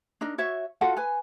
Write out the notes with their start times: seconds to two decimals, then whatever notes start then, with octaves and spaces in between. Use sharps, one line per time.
0.21 D4 D#4 A#4
0.38 F#4 C#5 E5
0.81 F4 F#4 A4 F#5
0.97 B4 G#5